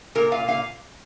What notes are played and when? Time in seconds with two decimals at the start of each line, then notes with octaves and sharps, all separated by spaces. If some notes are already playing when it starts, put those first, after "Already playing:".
0.15 A#2 A#4
0.32 A#2 F5
0.48 A#2 F5